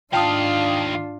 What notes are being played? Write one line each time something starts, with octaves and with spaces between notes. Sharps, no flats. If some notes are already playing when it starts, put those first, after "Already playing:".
G#2 D#3 D4 F4 F5 G5 A5 D#6